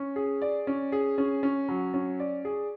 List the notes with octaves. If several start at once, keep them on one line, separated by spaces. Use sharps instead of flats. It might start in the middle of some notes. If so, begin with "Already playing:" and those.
Already playing: C#4
G#4
D5
C#4
G#4
C#4
C#4
F#3
C#4
D5
G#4